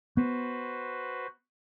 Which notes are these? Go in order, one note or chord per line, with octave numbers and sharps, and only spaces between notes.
B3 F#4 B4 C5